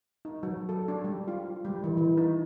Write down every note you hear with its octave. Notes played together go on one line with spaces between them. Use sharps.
D#4
F#3
A4
D4
G3
F4
G3
E3
E3
D#4